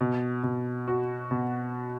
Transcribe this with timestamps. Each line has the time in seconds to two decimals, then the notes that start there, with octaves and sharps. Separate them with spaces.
0.01 B2
0.43 B2
0.88 F#4
1.31 B2